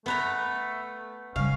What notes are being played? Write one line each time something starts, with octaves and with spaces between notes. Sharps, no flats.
A3 B3 B4 A#5
C#3 G3 C#4 F5